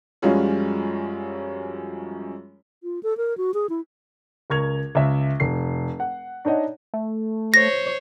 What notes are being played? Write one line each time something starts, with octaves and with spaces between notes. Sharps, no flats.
F#2 F3 G3 G#3 C#4 F4
F4
A4
A#4
F#4
G#4
E4
C#2 A#4 C#6 G#6 F7
C#2 E5
F1 C7
F#5
D4 D#4 C#5 D#5 F#5
A3
C5 C#5 A#6